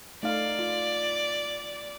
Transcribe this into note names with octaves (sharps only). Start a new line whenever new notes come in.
A3 D#4 D5 F5
F4